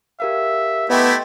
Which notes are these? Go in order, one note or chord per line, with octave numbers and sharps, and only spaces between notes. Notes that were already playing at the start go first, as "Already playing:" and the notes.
G4 A#4 E5 F5
A3 B3 E4 G4 D#5 G5 C6